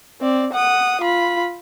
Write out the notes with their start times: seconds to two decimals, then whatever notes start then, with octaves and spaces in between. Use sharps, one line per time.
0.20 C4 D5
0.53 F#5 D#6
1.01 F4 B5